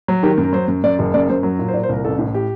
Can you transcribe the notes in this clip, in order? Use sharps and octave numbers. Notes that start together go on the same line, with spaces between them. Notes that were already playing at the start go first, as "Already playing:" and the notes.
F#3
D#3 G4
F#2
A#4
F#3 C5
F#2
F#2 D5
F#1
F#2 D5
F#2 C5
F#3 A#4
A#2
C5
A#2 D5
C5
C2 A#4
A1 A4
A2
G4